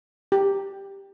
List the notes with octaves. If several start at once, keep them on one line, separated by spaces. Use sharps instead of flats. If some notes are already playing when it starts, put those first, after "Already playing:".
G4